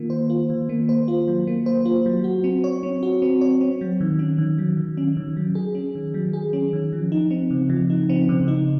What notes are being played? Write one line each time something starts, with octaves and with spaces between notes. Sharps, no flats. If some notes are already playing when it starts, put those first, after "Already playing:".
Already playing: D#3 A#3 F4
C5
F4
D#3
A#3
C5
F4
F#3
A#3
C5
F4
F#3
F#4
C4
C#5
C4
F#4
C4
C#5
C4
F#3
D#3
C#4
D#3
F#3
D#3
C#4
D#3
F#3
G#4
C#4
D#3
F#3
G#4
C#4
D#3
F3
D#4
C4
C#3
F3
D#4
C4
C#3
D#4